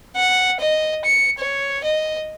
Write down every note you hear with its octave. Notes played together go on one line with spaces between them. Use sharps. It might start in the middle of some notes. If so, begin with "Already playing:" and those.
F#5
D#5
C#7
C#5
D#5